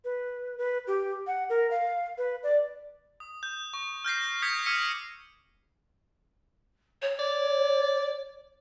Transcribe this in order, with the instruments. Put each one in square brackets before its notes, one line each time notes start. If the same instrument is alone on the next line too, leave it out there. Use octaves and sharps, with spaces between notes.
[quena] B4
B4
G4
F#5
A#4
F5
B4
D5
[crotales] D#6
G6
C#6
F6 G6 A#6 C7
D#6 G6 G#6 B6 C#7
D6 E6 F6 G#6 C#7 D#7
[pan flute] C#5
[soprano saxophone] D5